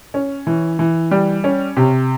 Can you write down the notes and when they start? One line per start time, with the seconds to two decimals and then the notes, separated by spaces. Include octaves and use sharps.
0.14 C#4
0.47 E3
0.79 E3
1.11 G3
1.44 C#4
1.77 C3